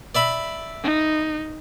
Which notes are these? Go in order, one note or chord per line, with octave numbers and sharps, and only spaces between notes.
D5 E5 B5
D#4